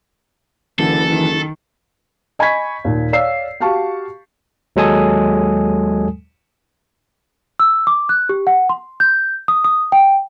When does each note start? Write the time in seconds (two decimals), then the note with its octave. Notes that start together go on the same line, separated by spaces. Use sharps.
0.79 F#1 D3 E3 A4
1.10 D#3
2.39 D#5 G#5 B5 C#6 G#6 B6
2.85 D#2 A#2
3.12 C#5 D5 F5 E6 C7
3.60 F#4 G4 F5 A5 C#6
4.76 D#2 F#3 G#3 A4 G#5 D#6
7.60 E6
7.87 D6
8.09 F#6
8.29 G4
8.47 F#5
8.69 C6
9.00 G6
9.48 D#6
9.64 D#6
9.92 G5